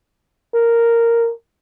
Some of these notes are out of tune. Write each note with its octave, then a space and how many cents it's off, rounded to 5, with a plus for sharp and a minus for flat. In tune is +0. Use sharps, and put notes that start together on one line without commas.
A#4 -5